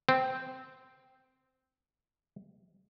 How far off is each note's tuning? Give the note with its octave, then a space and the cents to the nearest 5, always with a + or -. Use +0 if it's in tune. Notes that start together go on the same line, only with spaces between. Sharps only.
C4 -10